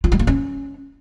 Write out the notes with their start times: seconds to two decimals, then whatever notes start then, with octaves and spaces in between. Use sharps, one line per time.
0.04 F4
0.12 G#3
0.19 A#3
0.27 C#4